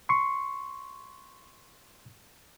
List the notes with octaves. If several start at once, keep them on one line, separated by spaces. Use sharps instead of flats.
C6 C#6